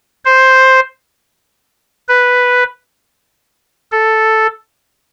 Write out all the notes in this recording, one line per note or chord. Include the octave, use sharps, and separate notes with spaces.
C5
B4
A4